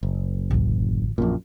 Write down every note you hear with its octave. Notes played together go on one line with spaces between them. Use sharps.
F#1
A1 D2
A#1 F#2 A#2